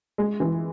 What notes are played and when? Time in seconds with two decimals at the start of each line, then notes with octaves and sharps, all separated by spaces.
0.18 G#3
0.40 E3